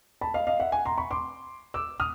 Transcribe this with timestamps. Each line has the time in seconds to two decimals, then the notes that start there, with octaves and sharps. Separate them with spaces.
0.21 A5 B5
0.34 D#5 F5
0.47 D#5 F5
0.60 E5 F#5
0.72 F#5 G#5
0.85 A#5 C6
0.98 B5 C#6
1.11 C6 D6
1.74 D6 E6
2.00 D#6 F6